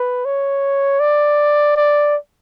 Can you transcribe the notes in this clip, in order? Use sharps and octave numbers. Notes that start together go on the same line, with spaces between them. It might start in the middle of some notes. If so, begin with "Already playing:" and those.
Already playing: B4
C#5
D5
D5